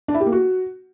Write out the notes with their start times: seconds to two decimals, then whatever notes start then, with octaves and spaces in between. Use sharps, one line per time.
0.08 D4
0.14 E4
0.20 G4
0.26 A#3
0.32 F#4